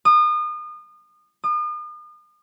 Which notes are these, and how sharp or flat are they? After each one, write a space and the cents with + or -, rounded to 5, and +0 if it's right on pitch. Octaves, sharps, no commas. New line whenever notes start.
D#6 -35
D#6 -40